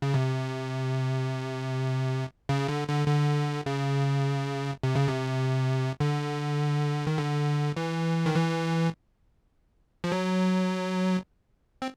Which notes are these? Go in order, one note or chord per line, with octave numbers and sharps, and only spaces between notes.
C#3
C3
C#3
D3
D3
D3
C#3
C3
C#3
C3
D3
D#3
D3
E3
D#3
E3
F3
F#3
C4